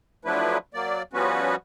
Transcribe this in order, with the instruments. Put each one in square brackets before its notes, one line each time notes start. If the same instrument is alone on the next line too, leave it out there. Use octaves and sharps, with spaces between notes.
[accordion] F3 F#3 A3 D4 E4 B4
F#3 A#3 D5
F3 G3 B3 C#4 F#4 B4